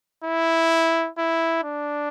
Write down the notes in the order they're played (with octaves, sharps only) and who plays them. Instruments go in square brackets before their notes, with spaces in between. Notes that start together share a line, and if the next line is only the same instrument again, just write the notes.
[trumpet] E4
E4
D4